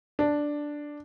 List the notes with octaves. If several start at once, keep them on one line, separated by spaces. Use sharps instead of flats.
D4